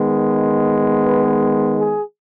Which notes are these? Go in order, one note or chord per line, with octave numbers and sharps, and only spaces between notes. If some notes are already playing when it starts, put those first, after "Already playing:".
Already playing: D#3 G#3 B3
B4
G#4